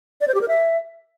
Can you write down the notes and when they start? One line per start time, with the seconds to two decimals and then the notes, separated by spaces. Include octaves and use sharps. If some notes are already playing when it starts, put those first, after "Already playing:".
0.21 D5
0.28 C5
0.35 G4
0.41 A#4
0.48 E5